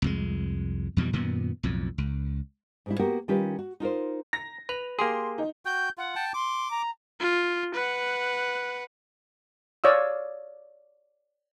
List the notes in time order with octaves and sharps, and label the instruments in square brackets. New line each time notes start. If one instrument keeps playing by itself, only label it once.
[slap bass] C2 F2 G#3
F2 B2 E3 G3
F#2 A#2 D#3 B3
B1 F2 A2
C#2
[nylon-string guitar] G#2 G3 E4
A#3 B3 F#4 G4 A#4
D#3 G3 C#4 F4 G4 B4
F#4
D#4 F4 A#4 C5
[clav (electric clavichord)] A#5 [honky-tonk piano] A#6
[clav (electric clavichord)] B4 [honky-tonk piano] F7
[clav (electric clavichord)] A#3 G4 G#4 [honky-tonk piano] C6
[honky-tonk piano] D#4
[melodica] F#4 G5 [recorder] G6
[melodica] F4 [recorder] F#5
[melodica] G5 A5
[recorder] C6 [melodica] D6
[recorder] A#5
[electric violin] F4
B4 F#5
[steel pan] C#5 D5 F5 D#6 E6